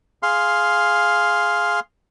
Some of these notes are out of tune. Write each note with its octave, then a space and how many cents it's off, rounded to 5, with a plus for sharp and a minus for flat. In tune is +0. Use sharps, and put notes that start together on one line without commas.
G#4 +0 F5 +5 C6 +0